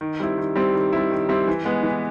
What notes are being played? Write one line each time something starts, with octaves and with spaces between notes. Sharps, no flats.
D#3
G3 C4 E4
D#3
G3 C4 E4
D#3
G3 C4 E4
D#3
G3 C4 E4
E3
G#3 B3
E3